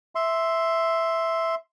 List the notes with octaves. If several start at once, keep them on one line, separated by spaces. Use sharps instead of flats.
E5 C6